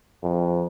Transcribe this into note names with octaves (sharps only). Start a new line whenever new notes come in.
F2